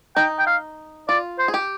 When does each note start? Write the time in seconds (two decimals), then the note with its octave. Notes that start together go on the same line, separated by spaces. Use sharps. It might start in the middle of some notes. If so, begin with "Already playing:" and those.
0.16 D#4 G5
0.39 G5
0.47 F5
1.08 F4 D5
1.38 C5
1.48 G#4
1.54 G4